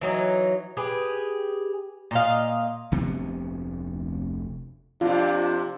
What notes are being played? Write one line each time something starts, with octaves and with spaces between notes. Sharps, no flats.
E3 F#3 D#4
G4 G#4 B4
A#2 D#5 F5
F1 D2 C3 B3
F2 C3 D4 F4